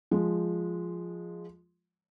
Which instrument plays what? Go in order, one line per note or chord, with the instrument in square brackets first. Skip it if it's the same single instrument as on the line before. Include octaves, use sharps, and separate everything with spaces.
[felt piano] F3 G#3